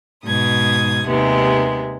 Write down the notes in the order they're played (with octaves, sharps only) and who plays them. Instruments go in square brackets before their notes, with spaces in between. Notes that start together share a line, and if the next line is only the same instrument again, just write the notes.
[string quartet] G#2 B2 D#6 G#6
D#2 C3 G#3 B3